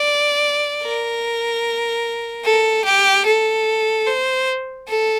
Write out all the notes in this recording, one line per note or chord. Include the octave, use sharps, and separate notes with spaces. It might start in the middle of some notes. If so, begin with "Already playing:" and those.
Already playing: D5
A#4
A4
G4
A4
C5
A4